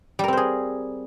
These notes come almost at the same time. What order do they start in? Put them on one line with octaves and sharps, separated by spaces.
G3 A#4 C4 C5 G#4